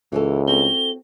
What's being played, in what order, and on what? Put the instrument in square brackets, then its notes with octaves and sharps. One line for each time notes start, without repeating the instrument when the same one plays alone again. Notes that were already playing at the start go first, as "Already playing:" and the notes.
[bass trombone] C#2 [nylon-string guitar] E3 C#4 A4
[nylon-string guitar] C4 F#4 A4 [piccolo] G7